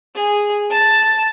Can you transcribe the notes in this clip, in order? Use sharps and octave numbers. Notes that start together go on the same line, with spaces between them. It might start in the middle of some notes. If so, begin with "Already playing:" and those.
G#4
A5